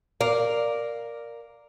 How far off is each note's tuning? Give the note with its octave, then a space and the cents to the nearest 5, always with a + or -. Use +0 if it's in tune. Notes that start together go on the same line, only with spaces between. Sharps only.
A#4 +0 D5 +0 F5 +0